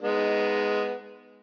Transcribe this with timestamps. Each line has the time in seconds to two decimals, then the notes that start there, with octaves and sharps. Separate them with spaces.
0.02 G#3 B3 D#4